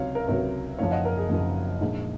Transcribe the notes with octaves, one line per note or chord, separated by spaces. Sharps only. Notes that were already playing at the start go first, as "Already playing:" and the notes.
Already playing: C#2 C3 F#3 C#5 F5
A#4
C#2 C3 F#3 A#4 C#5
F#1 F#2 F3 C#5 F5
D#5 F#5
A#4
G#4
F#1 F#2 F3
A#1 A#2 G#3 D#4